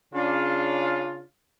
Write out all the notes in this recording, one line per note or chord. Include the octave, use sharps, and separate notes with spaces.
C#3 D4 F4